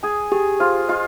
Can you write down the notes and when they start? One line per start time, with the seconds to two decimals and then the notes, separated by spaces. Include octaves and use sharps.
0.03 G#4 G#5
0.32 G4 G#4
0.60 F4 C5
0.89 F4 D#5